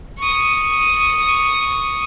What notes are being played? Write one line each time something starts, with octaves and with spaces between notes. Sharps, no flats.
C#6 D#6